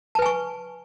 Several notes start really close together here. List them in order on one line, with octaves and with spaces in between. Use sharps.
A5 B4 G#5 C#6